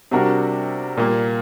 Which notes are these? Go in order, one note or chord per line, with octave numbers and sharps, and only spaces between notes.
C3 G3 D4 F#4 A#4
A#2 G3 A#3